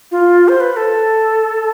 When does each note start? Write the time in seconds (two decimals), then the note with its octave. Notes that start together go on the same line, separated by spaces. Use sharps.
0.12 F4
0.48 C5
0.61 B4
0.72 B4
0.76 A4